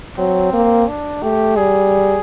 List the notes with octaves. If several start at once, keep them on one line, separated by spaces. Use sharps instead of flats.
F#3 C4
A#3
D4
A3 G4
G3 G#4